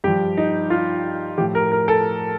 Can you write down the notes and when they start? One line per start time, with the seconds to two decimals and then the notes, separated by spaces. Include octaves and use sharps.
0.04 G2 F3 G4
0.37 D#4
0.70 F4
1.38 A2 F3 G4
1.55 A#4
1.72 A#4
1.88 A4